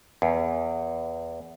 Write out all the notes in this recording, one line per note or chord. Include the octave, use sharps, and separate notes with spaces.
E2